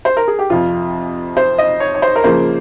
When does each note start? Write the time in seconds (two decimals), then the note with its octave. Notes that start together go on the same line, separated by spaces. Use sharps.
0.05 C5
0.17 A#4
0.28 G#4
0.39 G4
0.50 F2 C3 F3 F4
1.37 C5
1.58 D#5
1.80 C#5
1.95 C#5
2.02 C5
2.16 A#4
2.24 C#3 F3 A#3 C5